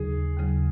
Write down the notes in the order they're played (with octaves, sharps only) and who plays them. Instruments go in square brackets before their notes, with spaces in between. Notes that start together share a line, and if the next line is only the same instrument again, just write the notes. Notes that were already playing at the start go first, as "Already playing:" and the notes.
Already playing: [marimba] D#2 C#3 F#3 [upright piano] G#4
[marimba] D#2 C#3 F#3